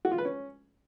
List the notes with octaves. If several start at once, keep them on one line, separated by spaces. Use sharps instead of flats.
F#4
F4
B4
C#4